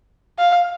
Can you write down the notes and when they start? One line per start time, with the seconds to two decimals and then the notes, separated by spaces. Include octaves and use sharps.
0.39 F5